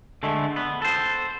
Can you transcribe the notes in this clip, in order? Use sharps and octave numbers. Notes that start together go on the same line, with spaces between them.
D3 G#3 A3
B3
A4 C5